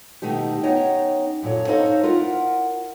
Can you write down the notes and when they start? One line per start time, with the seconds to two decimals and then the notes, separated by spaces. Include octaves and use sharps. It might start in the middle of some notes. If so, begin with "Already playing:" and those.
0.22 B2 D#3 A3 D#4 G4
0.63 B3 C#4 D#4 C#5 D#5 G5
1.43 F#2 A#2 A4 C#5
1.68 D#4 A4 C5 C#5 D#5 F5
2.03 E4 F4 A#4 F#5